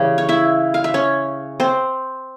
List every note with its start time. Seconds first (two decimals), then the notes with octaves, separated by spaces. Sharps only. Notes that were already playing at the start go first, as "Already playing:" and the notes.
Already playing: C#3 E3 G3 C#4
0.18 C#5
0.29 E4 E5
0.74 F5
0.84 E5
0.94 C#4 C#5
1.60 C4 C5